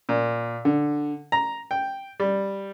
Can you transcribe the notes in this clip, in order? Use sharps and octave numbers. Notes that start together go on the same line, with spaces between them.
A#2
D3
A#5
G5
G3